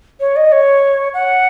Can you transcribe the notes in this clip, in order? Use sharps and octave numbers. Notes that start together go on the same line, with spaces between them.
C#5
D#5
C#5
F#5